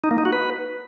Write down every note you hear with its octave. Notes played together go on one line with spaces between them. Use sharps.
D#4
A#3
D#4
F#4
B4